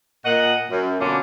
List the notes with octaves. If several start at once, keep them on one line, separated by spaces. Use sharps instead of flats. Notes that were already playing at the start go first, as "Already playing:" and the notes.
A#2 D#5 F#5
F#2
B2 D3 A#3 C#4 D4 F4